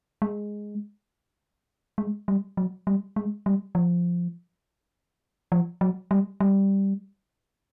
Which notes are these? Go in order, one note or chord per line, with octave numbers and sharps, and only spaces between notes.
G#3
G#3
G3
F#3
G3
G#3
G3
F3
F3
F#3
G3
G3